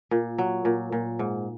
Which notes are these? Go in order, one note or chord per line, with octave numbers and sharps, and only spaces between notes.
A#2
F#3
A#2
A#2
G#2